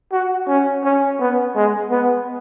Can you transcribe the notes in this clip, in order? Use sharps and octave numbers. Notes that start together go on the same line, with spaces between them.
F#4
C#4
C#4
B3
G#3
B3